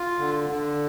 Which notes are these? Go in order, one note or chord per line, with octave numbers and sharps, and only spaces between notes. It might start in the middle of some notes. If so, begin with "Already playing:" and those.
Already playing: F4
D3
D3